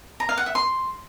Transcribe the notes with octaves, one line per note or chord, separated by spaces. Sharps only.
A#5
F5
F#5
E5
C6